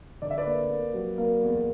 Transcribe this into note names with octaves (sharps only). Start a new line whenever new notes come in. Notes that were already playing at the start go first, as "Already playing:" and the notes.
D3 D5
E5
B4 D5
A#3
A#3
F#3
A#3
E2